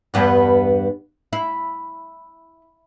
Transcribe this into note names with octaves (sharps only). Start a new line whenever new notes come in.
E2 G2 B3
E4